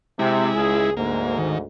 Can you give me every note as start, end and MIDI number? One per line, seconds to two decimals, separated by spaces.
0.19 0.49 48
0.19 0.90 56
0.19 0.90 64
0.55 0.92 37
0.55 0.92 68
0.97 1.65 38
0.97 1.65 44
0.97 1.38 58
1.38 1.58 51